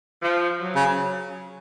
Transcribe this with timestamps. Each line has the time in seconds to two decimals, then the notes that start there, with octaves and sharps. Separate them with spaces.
0.22 F3
0.61 F#3
0.76 C#3